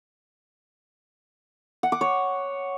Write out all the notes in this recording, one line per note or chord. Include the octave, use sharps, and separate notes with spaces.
F#5
D6
C#5